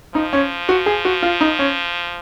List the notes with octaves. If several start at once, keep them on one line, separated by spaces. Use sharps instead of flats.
F3 D#4
C#4
F#4
G#4
F#4
F4
D#4
C#4